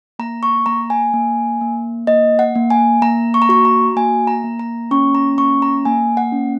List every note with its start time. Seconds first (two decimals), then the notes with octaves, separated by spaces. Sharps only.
0.19 A#3 A#5
0.43 C#6
0.66 A#3 A#5
0.90 G#5
1.13 A#3
1.61 A#3
2.07 A#3 D#5
2.39 F#5
2.55 A#3
2.70 G#5
3.02 A#3 A#5
3.34 C#6
3.42 A#5
3.49 F#4 C#6
3.65 A#5
3.96 A#3 G#5
4.27 A#5
4.44 A#3
4.59 A#5
4.91 C#4 C#6
5.15 A#5
5.38 A#3 C#6
5.62 A#5
5.85 A#3 G#5
6.17 F#5
6.32 C#4